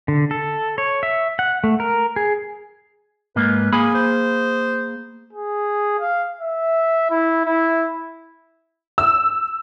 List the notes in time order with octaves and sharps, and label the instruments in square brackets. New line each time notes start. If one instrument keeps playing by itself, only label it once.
[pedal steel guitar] D3
A4
C#5
E5
F#5
A3
A#4
G#4
[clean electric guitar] G#2 A#3 [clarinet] B4
[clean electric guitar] A#3 G#4 B5 [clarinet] G#5
[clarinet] C5
[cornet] G#4
F5
E5
E4
E4
[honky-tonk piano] E6